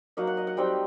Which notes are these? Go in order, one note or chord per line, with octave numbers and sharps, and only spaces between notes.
F#3 A#3 D#4 F#5
F#5
D#5
F#5
G3 C4 D#4 G5